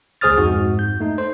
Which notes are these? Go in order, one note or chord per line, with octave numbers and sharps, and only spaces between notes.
C#2 G#4 C5 D#6 F6 A6
F2 G#2 F#4
G6
A3 D#4
C5